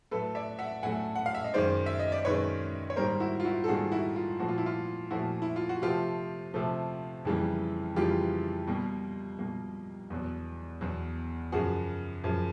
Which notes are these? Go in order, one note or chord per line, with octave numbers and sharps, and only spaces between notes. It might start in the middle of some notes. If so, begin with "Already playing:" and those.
A2 F#3 A3 A4 B4
D5 E5
E5 F#5
A2 F#3 A3 F#5 G#5
F#5
F5
E5
D#5
F#2 D#3 G#3 C5 D5
E5
D#5
D5
F#2 D#3 G#3 B4 C#5
C#5
G#2 D#3 G3 A#3 A#4 C5
E4 F#4
F4
E4 F#4
A4
G#2 D#3 G3 A#3 F#4 G#4
E4 F#4
F4
A#2 F3 A3 F#4
F4
E4
F4
A#2 F3 A3 E4 F#4
E4
F4
F#4
C3 F3 A3 F4 G4
C3 F3 A3
F2 C#3 E3 G3 A#3
F2 C#3 E3 G3 A#3 F4 G4
B2 G3 A#3
B2 G3 A#3
E2 B2 F#3
E2 B2 F#3
F#2 C#3 F3 F#4 G#4
F#2 C#3 F3